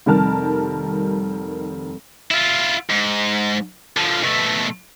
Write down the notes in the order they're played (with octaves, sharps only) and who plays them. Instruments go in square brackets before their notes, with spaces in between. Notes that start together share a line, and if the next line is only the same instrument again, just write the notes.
[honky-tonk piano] F1 D#3 G3 A#4 A5 F6
[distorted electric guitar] E4 F4
G#2
D3 F3
B2 A3